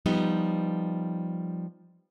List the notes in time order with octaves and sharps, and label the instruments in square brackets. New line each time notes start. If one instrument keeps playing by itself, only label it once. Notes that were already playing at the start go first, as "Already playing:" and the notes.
[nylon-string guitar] F3 G3 B3 D#4